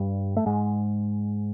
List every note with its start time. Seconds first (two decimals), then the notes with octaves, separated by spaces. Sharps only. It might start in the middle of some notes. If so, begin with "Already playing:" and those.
Already playing: G2 G3
0.37 A3
0.46 G#2 G#3